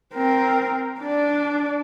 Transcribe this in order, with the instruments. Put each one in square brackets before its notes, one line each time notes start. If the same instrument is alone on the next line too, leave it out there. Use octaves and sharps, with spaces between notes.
[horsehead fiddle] C4 A#4
D4 D5